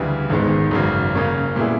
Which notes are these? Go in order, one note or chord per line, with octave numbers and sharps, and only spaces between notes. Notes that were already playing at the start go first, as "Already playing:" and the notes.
Already playing: D2 C#3 E3 G3
G#1 G#2 D#3 G#3 B3
G#1 F#2 C#3 F#3
C#3 F#3 A#3 C#4
A#2 G3 B3 E4 G#4